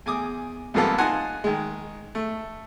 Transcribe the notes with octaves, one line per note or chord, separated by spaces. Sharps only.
E2 G#5 D6 D#6
C2 G#2 F3 A#3 B3 A4
D#4 F4 F#5 G#5 A5 C6
D#3 G#3
A3